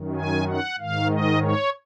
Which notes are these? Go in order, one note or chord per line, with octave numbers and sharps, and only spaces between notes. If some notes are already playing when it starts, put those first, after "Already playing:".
Already playing: F#2 D#3
G#5
F#5
G#2 D#3 F5
D#5
C#5